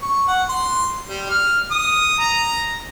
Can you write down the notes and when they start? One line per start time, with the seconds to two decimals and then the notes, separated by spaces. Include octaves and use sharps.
0.02 C#6
0.27 F#5
0.49 C6
1.07 G3
1.29 F6
1.71 D#6
2.19 A#5